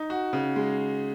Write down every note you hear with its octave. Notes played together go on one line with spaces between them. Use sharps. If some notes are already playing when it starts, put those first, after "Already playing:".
Already playing: D#4
F#4
C#3
G#3